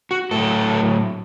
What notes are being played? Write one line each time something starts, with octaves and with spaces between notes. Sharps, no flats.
F#4
A2 F#3 A4